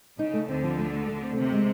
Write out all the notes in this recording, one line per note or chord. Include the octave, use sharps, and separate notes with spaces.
C#3 D#4
A3
D2 D3 C4
F3
A3
A3
A3
C4
D#2 C3
G#3